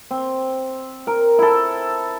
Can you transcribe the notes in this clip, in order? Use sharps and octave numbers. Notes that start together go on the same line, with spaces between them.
C4
A#4
E4 A4